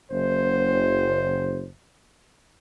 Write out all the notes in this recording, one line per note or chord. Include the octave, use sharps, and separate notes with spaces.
F#1 C5